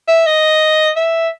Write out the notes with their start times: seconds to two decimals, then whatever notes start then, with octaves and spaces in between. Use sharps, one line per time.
0.08 E5
0.26 D#5
0.96 E5